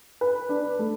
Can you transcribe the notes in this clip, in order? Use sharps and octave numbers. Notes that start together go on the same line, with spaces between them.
B4
D4
A3